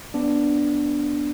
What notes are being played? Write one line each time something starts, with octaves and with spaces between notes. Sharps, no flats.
B3 D4